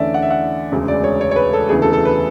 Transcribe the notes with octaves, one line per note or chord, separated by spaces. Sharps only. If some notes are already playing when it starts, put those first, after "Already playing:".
Already playing: E2 D3 A3 C#4 D5 E5
F#5
E5
F#5
E1 D2 C#3 G#3
D5
C#5
C#5
C#5
B4
A4
E1 D2 C#3 E3 B3 G#4
A4
A4
B4